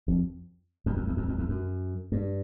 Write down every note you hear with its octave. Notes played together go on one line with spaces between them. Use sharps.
F2
F2
F2
E2
F2
F2
E2
F#2
G2